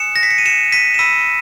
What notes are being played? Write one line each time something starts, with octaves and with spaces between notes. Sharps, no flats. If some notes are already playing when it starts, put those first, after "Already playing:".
Already playing: G#5 D#6 F#6 C#7 E7
A#6
B6
C#7
D#7
C#7 E7
B6 D#7
E7
B5 E6 B6 D#7